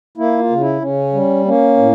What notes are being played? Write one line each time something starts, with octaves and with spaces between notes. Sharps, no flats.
A#3 E4
F4
C#3
E4
C#3 C#4
G3
A#3 C#4
A2